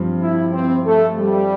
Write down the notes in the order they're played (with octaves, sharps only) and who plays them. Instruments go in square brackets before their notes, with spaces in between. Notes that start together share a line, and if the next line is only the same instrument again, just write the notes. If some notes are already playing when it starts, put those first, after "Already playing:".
Already playing: [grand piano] G2 F3 C4
[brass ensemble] E4
C4
A3
G3